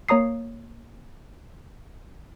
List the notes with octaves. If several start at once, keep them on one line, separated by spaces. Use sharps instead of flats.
A#3 C#5 A#5 D#6 C7